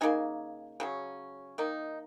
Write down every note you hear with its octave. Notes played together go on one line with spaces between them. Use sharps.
C#3 A#3 D#4 G#5
C#3 F#3 C#4
D#3 A#3 D#4